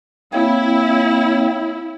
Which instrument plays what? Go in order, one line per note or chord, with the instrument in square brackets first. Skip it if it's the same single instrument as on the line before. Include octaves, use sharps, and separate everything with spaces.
[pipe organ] A#3 C4 C#5 [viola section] E4